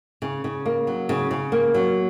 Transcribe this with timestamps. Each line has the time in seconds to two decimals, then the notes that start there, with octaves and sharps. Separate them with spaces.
0.22 C#3
0.44 C#3
0.66 A#3
0.87 F#3
1.09 C#3
1.31 C#3
1.52 A#3
1.74 F#3